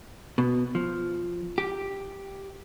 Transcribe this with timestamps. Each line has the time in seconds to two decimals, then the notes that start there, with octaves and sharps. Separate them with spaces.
0.38 B2
0.75 F3
1.58 G4